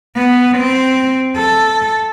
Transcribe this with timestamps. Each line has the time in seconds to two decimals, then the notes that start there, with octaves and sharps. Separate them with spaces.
0.16 B3
0.58 C4
1.36 A4